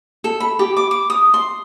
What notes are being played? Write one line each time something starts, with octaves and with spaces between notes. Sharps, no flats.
A4
B5
G4
D6
D6
D#6
C6